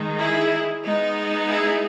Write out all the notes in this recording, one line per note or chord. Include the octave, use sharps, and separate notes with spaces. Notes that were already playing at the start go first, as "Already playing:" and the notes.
Already playing: D#3 G#3 D#4
E4 G#4
G#3 B3 D#4
E4 G#4